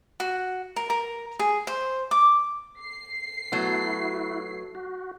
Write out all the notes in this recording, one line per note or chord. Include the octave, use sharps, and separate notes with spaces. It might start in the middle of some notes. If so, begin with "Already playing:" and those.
F#4
A#4
A#4
G#4
C5
D6
C7
F#3 A3 B3 E4 F#4
F#4